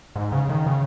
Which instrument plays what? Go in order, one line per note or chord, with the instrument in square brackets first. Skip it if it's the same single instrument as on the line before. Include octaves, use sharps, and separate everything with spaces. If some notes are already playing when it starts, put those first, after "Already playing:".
[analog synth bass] G#2
C#3
D#3
C#3